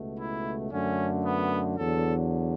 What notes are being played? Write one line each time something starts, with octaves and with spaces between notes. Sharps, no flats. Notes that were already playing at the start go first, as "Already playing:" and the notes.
Already playing: C#2 B2 A3
E4
F#2 D3 A3 C#4
B3
E2 D3 F#3 A4